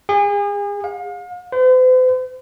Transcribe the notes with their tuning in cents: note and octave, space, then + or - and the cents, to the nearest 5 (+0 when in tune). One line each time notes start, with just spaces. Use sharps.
G#4 -35
F5 +40
C5 -45